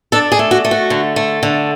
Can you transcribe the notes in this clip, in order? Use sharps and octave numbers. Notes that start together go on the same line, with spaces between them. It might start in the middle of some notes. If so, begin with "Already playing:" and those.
D4 A4
G#4
A3
F#4
A3
F#4
D3
A3
D3